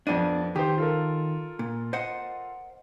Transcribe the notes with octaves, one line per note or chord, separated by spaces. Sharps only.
F2 B3 D4 D5 D#7
D#3 G4 C5
F4 A4 A#4
A#2
C5 D#5 F#5